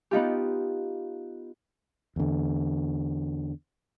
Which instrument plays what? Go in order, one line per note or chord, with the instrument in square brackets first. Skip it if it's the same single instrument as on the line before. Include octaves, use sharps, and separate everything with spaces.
[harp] B3 D#4 F4 G4
[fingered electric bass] E2 D3